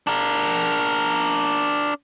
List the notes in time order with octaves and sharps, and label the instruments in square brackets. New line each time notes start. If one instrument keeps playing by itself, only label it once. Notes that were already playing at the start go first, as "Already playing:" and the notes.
[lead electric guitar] D4 A#4